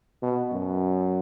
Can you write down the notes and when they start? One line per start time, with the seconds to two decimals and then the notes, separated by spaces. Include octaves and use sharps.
0.22 B2
0.52 F#2